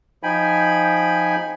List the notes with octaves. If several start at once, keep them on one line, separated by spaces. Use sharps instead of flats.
F3 D#4 G5 G#5 B5